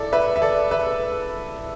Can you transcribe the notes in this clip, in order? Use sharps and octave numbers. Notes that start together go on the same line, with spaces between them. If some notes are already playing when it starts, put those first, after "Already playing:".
Already playing: D4 E4 A4 D5
B4 E5
E5
A4 D5
B4 E5